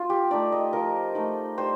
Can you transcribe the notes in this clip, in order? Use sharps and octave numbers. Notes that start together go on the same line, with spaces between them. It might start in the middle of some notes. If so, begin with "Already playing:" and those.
Already playing: F4
G4
A3 D#4 D5
D#5
F3 A#4
A3 D#4
G3 C5